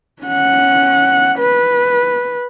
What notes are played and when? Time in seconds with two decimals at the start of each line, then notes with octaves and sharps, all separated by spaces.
0.22 C#4 F#5
1.39 B4